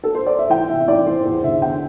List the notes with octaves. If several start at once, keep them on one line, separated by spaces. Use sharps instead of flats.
A4
C5
D5
E5
E3 G5
C3 E5
E5
E3 D5
E3 C5
E2 C5
D3 E5
E2 G5